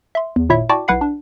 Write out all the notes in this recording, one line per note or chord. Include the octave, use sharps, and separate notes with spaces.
E5 C6
E2
G#1 A#2 E4 C#5 E5
E4 F#4 D5 G5 A5 D6
B1 E4 B4 F#5 B5 C7
D4